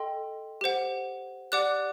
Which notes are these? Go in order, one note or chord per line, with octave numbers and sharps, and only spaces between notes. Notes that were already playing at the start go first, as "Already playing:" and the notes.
Already playing: A4 D#5 G5 C6
G4 C5 F#5
G4 D5 F#5 D6 F#6